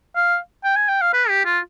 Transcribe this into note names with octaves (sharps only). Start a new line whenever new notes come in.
F5
G5
G#5
G5
F5
B4
G4
F4